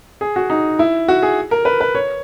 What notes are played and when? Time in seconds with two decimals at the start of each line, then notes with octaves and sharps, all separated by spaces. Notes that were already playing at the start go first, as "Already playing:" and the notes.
0.21 G#4
0.36 F#4
0.50 D#4
0.79 E4
1.08 F#4
1.23 G#4
1.51 A#4
1.65 B4
1.80 B4
1.95 C#5